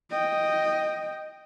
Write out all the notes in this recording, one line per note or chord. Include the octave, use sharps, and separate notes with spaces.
D#5 G5